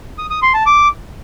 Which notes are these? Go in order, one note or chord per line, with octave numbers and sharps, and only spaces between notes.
D#6
D#6
C6
A5
D6